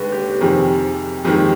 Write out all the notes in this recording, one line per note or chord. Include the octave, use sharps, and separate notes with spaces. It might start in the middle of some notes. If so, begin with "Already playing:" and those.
Already playing: D#2 D3 G#3 B4
G4
F2 C3 D#3 G#4
F2 D#3 G#3 G4